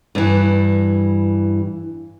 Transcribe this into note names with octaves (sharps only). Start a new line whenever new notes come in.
G2 E3